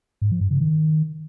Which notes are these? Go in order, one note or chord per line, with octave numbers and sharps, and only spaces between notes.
G#2
F3
G2
C#3
D#3